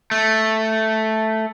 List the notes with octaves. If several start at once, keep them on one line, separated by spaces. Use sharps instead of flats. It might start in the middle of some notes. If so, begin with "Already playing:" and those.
A3